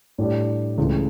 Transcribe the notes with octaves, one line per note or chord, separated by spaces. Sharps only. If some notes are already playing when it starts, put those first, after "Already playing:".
A2 G3 D4 G4 D5
C#2 C#3 E3 A3